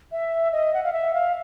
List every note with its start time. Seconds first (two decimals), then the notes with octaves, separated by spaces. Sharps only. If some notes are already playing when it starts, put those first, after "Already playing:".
0.12 E5
0.52 D#5
0.74 F#5
0.84 F5
0.93 E5
1.14 F5